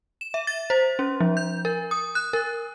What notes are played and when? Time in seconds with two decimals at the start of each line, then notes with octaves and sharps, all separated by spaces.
0.21 E7
0.34 E5
0.47 A6
0.70 C5
0.99 C#4
1.20 F3
1.37 G6
1.65 A#4
1.91 D#6
2.15 F#6
2.33 A#4